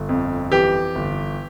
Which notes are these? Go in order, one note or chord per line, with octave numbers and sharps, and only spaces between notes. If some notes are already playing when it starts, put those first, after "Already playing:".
Already playing: G1
F2
E3 G4
G1